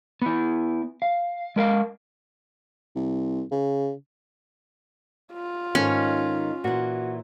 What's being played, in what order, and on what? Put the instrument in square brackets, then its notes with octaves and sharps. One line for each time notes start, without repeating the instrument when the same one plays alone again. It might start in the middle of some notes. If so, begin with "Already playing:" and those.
[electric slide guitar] B3 E4
F5
G#3 A#4 E5 F5
[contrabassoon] C2
C#3
[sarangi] F4
[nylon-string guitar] G#2 D#3 A4 [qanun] C#4
[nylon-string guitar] A#2 E3 [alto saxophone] F#4